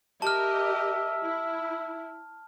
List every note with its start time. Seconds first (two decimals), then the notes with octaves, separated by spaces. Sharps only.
0.22 G4 A#4 D#5 E5 A5 F6
1.21 E4